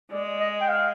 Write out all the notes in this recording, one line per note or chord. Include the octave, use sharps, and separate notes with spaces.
G#3 D5
D#5
G5
F5